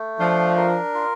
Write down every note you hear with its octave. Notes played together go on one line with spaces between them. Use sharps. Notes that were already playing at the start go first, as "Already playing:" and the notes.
Already playing: A3
F3 D4
A#4
F4